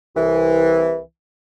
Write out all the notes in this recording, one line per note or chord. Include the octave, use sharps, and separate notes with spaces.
C2 E3